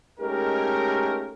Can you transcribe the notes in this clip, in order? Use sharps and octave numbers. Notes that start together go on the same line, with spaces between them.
G#3 A3 C#4 D#4 G4 A#4